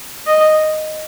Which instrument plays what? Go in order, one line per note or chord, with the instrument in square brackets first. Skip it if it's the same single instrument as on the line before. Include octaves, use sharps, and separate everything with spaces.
[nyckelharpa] D#5